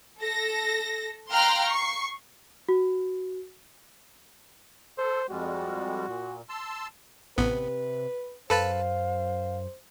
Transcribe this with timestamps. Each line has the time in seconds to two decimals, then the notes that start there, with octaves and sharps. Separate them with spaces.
0.20 A4 A#6
1.32 F5 G5 A#5 C6 F6 F#6
1.66 C#6 C7
2.69 F#4
4.98 A4 C5
5.29 F2 G3 G#3 F#4
6.07 A#2
6.49 A5 C6 E6
7.38 A1 C3 B3 B4
8.50 F#2 A4 B4 C5 F5 A5